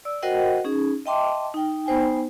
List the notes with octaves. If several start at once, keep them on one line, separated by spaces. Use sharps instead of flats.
D5 E6
F#4 A#4 C5 D#5 F#5 G5
C#4 D#4 G#4
D#5 E5 G5 A5 C6 D6
D#4 G5
B3 D#4 C5 G5 G#5